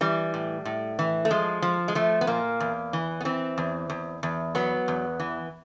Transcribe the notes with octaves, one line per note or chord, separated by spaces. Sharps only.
E3 G3
A2
A2
E3
A3
F3 G#3
F3
G#3
F3 A3
B3
A#2 A#3
E2
E3
B3
E3 C4
E2
E2
E2
F#3 B3
E2
E3